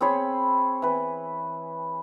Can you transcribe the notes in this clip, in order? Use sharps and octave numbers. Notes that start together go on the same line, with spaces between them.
C4 G#4 C#5 B5
E3 B4